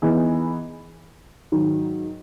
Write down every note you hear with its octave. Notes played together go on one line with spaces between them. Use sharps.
E3 B3 D#4 G#4
G#2 D#3 F#3